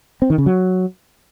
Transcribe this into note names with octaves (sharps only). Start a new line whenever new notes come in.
C4
D#3
C#3
F#3